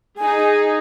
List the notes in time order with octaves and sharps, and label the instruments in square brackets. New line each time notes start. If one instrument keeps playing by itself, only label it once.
[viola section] D#4 G#4 [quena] G#5